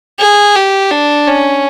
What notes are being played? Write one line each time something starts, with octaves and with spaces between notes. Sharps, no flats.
G#4
G4
D4
C#4